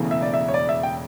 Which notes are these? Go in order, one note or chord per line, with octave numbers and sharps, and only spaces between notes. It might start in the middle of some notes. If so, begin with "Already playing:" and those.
Already playing: E1 E2 C#3 E3 A3
E5
D5
E5
C#5
D5
E5
G5